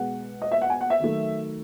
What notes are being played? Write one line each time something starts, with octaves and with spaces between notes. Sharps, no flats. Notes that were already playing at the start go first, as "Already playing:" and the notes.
Already playing: B2 G#3 F#5
D#5
E5
F#5
G#5
F#5
E5
D#3 F#3 A3